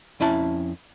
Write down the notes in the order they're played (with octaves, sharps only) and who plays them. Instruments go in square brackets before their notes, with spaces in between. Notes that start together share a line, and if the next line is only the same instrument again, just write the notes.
[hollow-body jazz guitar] F2 C#4 E4 A5